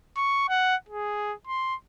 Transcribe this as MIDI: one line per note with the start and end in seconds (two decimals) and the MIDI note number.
0.17 0.45 85
0.49 0.76 78
0.89 1.33 68
1.48 1.75 84